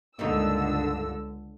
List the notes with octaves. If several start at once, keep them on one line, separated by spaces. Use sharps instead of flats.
C#2 G2 D3 A#3 D#4 E6